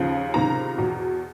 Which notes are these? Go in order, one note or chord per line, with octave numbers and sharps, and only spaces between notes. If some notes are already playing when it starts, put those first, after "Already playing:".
Already playing: D#2 C#3 F3
C#2 C3 D#3 A#5
E2 B2